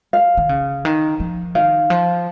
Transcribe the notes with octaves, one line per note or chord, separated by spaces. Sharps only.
F5
D#3
C#3
D#3
F3
D#3 F5
F3